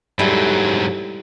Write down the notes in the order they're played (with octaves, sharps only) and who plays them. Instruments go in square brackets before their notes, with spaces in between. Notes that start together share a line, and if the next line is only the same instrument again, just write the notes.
[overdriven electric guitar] G#2 F#3 [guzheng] G3 E4 A4